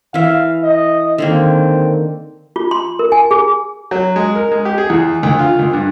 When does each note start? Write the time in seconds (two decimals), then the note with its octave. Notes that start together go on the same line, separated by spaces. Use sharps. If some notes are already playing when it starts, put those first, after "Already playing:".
0.14 E3 E5 F5
0.62 D#5
1.18 D3 D#3 A#3 C4
2.56 F4
2.71 C6
2.99 A#4
3.12 G#5
3.31 G#4
3.91 F#3
4.16 G#3
4.35 A#4
4.52 G#3
4.65 G4
4.78 G#4
4.90 E2
5.23 D2
5.39 F4
5.59 D2
5.73 G2